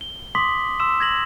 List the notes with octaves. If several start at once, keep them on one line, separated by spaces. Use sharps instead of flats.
G7
C6 D6 D#6 B6 F#7
C6 E6 E7
G#6 A#6 F#7